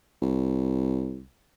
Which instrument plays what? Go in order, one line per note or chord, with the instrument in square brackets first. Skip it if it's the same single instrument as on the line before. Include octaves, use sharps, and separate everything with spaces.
[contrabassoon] C2